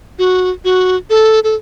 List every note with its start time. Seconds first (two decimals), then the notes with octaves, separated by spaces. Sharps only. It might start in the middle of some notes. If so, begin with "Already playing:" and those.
0.19 F#4
0.64 F#4
1.10 A4
1.44 A4